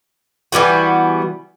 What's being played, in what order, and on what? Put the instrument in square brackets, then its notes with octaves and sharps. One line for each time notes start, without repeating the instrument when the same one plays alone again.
[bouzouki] E3 G3 B3 F#4